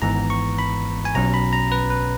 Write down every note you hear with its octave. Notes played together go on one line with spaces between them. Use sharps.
G#1 G#2 E3 B3 A#5
C#6
B5
G#5
B1 B2 F#3 C#4 A#5
B5
A#5
B4
B4